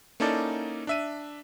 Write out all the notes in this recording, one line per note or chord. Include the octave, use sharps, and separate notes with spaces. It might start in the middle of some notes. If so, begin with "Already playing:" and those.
A#3 C#4 D#4 E4 A4 D5
D4 E5 D#7